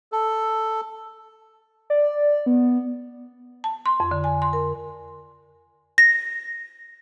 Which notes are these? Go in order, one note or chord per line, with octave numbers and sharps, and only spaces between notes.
A4
D5
B3
A5
C6
F2
D3
G#5
C6
A#4
A#6